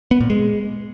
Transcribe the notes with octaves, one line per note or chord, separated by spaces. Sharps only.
B3
A#2
G#3